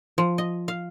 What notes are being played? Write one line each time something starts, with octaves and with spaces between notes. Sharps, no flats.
F3
D#5
F5